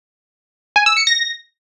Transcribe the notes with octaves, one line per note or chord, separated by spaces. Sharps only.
G#5
E6
C#7
A#6